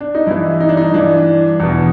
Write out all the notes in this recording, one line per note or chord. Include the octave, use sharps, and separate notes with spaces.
D4
D#4
G2 E3 E4
D#4
D4
D#4
G2 E3 D4
E2 B2